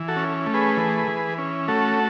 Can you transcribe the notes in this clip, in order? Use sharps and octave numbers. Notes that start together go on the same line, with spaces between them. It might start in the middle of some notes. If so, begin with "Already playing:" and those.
Already playing: E3
F#4 A4
C#4
A3
G#4 B4
E3
E3
C#4
A3 F#4 A4